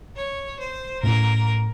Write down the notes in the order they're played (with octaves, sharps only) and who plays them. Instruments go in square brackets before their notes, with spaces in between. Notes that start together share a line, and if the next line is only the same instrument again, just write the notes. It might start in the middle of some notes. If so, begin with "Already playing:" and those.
[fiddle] C#5
C5
[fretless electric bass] A2 A3 C#4 [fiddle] A#4